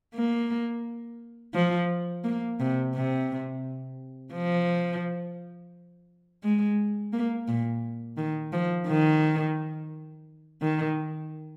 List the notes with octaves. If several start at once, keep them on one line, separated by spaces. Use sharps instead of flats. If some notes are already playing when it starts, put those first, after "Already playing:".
A#3
F3
A#3
C3
C3
F3
G#3
A#3
A#2
D#3
F3
D#3
D#3